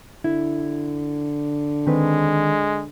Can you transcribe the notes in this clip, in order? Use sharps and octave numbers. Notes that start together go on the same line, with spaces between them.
D3 E4
D#3 G#3 C4 B4